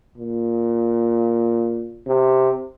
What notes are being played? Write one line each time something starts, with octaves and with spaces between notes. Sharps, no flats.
A#2
C3